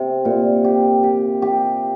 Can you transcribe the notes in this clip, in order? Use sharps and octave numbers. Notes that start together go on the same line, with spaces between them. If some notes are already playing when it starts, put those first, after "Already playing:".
Already playing: C3 C4
A#2
G4
G4
G4